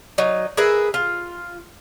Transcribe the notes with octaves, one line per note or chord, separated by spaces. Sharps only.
F#3 D#4
G#4 A#4 B4 E5
F4